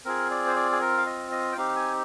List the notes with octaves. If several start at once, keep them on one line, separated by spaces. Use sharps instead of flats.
C4 F4 G#4 A#4
D5
C5
D5
G#4
A#4
F5
D#5
D#5
G5
C4 D#4 G4 F5
G#5